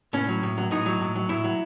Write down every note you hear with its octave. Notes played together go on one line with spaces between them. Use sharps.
A2 C#4
F#3
A2
F#3
A2 D#4
F#3
A2
F#3
A2 E4
F#3